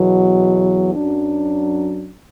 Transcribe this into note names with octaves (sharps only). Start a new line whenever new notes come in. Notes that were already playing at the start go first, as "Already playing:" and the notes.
Already playing: E2 B2 F#3
F#2 F#3 D4